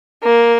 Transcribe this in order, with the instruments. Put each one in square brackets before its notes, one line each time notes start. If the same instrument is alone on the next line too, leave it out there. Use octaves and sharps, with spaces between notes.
[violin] A#3